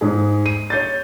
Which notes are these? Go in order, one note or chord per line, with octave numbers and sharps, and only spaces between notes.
G#2 G#4
D#7
C#5 G6 A6